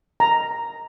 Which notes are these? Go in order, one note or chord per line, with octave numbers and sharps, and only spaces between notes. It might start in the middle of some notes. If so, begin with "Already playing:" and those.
A#5